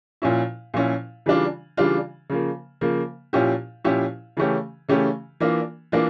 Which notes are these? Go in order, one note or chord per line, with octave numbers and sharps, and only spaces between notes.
A#2 F3 C#4 E4
A#2 F3 C#4 E4
C#3 E3 G3 D4 F4
C#3 E3 G3 D4 F4
C#3 F3 A#3
C#3 F3 A#3
A#2 F3 C#4 E4 G4
A#2 F3 C#4 E4 G4
C#3 E3 A3 C#4 G4
C#3 E3 A3 C#4 G4
E3 A#3 D4 F4
E3 A#3 D4 F4